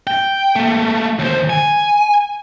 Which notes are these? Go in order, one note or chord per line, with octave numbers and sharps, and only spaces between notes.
G5
A3 A#3
D#2 C5
G#5